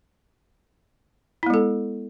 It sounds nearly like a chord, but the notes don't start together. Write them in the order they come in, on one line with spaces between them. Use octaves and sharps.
E4 B3 G#3 A4